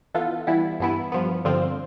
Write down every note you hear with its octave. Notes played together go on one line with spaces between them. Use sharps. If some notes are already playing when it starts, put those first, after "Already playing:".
E3 B3 F4 A4
E3 G3 B3 E4
G2 E3 B3 E4
G2 F3 B3
G2 D3 F3 C4 F4